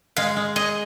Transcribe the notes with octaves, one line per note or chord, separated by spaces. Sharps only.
G#3 F5
G#3
G#4 D#5